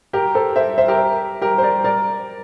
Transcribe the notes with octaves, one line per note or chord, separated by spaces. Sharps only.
G4 A#4
A4 C5
C5 E5
C5 E5
G4 A#4
G4 A#4
C5
A#4 D5
A#4 D5